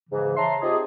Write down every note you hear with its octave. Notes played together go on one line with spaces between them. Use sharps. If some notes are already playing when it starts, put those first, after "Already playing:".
G#2 C#3 E3
C#5 E5 A5 A#5 C6
C4 D#4 F4 G4 G#4